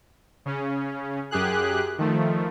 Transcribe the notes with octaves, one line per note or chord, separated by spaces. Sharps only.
C#3 C#4
F#2 G4 G#4 F#6
D#3 F3 A3